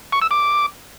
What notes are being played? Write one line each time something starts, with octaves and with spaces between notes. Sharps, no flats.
C#6
E6
D6